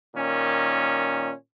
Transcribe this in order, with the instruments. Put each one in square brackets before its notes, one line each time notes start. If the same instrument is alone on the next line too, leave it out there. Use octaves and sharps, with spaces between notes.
[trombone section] A#2 D#3 C#4